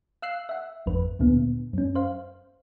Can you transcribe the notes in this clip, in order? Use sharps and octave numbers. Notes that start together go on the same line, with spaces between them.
F5 E6 F#6 C7
E5 F#5
G#1 F2 B4
D2 A#2 D3 B3
F#2 C#4
C5 F5